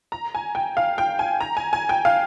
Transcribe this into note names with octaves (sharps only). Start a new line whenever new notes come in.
A#5
G#5
G5
F5
G5
G#5
A#5
G#5
G#5
G5
F5